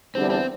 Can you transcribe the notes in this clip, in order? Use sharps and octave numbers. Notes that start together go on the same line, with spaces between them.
E2 D3 G3 C4 D4
C4